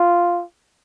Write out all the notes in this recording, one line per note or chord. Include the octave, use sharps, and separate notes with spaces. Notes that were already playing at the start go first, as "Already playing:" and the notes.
Already playing: F4